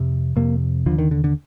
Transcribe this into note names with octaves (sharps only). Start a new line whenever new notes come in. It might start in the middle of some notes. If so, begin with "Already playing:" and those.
Already playing: F2 C3
F2 C3 A#3
D#2 D3 F3
D#3
D3
D3